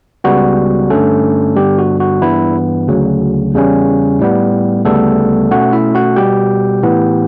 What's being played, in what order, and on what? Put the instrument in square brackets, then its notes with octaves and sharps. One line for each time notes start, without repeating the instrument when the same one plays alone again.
[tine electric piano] C#2 C#3 G3 B3 F#4
G2 D3 A3 C#4 A4
G2 D3 G3 B3 G4
F#4
F#4
G2 E3 B3 E4
D2 C#3 F#3
E2 C#3 G3 C#4
A2 G3 B3
D2 C#3 G3 A3 B3 A4
B2 A3 C#4 F#4 F#5
E4 E5
F#4 F#5
B2 G3 B3 G4 G5
A2 E3 B3